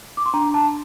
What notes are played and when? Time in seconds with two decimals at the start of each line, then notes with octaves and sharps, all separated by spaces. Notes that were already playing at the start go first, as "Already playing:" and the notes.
0.17 D6
0.26 C6
0.34 D4 A#5
0.54 A5